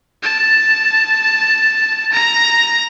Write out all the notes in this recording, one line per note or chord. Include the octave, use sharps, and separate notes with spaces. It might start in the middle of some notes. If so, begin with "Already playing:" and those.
A5
A#5